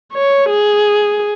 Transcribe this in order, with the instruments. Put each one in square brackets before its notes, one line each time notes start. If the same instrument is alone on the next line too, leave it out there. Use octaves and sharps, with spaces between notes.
[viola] C#5
G#4